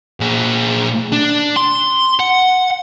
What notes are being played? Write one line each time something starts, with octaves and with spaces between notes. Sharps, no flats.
A#2 G#4
D4
C6
F#5